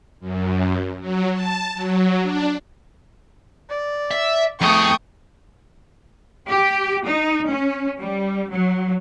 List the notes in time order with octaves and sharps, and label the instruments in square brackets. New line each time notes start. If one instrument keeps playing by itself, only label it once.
[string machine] F#2
F#3
A5
F#3
D4
[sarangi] D5
[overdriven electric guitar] E5
[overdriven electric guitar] F2 G#4 [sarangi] A3 [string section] G5 C#6 D#6
[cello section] G4
D#4
C#4
G3
F#3